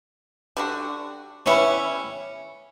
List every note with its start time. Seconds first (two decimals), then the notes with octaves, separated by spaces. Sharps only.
0.57 D3 G3 D4 F#4
1.46 G3 B3 C#4 E4